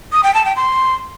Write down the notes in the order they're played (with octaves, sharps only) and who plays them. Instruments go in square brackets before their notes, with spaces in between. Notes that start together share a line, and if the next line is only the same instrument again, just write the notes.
[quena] D#6
G5
A5
G5
C6